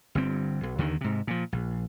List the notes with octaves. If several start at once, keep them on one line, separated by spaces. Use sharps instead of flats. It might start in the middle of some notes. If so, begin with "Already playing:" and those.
G1 G2 C4
B1
D#2 D3 D#3
G#2 C3
A#2 F3
A#1